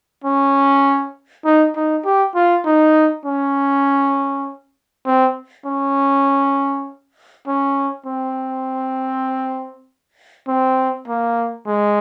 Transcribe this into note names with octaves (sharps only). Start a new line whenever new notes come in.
C#4
D#4
D#4
G4
F4
D#4
C#4
C4
C#4
C#4
C4
C4
A#3
G#3